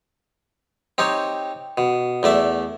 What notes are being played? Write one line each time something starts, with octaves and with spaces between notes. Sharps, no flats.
C4 D#4 G4 C#5
B2
E2 A3 D5 E5